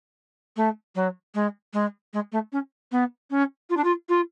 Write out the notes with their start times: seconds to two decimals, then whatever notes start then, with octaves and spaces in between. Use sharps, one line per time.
0.56 A3
0.95 F#3
1.34 G#3
1.73 G#3
2.13 G#3
2.32 A3
2.52 C#4
2.91 B3
3.30 C#4
3.70 F4
3.77 D4
3.84 F4
4.09 F4